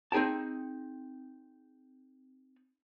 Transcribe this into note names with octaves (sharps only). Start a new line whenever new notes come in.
C4 D#4 G#4 G5 A5